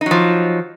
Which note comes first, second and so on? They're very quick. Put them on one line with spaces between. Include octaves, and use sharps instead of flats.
D#4 F#3 F3